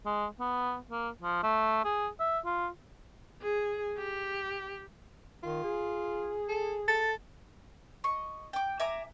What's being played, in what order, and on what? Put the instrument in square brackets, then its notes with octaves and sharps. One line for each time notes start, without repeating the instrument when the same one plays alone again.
[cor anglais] G#3
B3
A#3
F3
A3
G#4
E5
F4
[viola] G#4
G4
[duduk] D#3 [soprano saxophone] F4
[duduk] G#4
[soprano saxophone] A4
[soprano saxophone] A4 [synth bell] A6
[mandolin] D#5 C#6
G5 D6
E5 G#5 A#5 D6